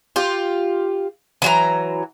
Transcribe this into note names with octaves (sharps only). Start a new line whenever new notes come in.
F4 G4
E3 F#3 A#5